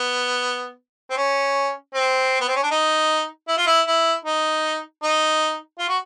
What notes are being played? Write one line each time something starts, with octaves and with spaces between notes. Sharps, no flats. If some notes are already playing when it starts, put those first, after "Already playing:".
Already playing: B3
C4
C#4
C4
B3
C4
C#4
D4
D#4
E4
F4
E4
E4
D#4
D#4
F4
F#4